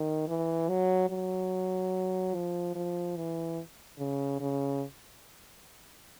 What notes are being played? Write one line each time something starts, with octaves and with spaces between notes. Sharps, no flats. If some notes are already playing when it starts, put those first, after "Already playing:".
Already playing: D#3
E3
F#3
F#3
F3
F3
E3
C#3
C#3